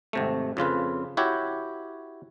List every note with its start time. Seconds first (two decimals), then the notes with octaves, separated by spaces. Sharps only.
0.13 G#1 C3 A3
0.57 F2 C#3 F4 B4
1.17 E4 F#4 G4 C#5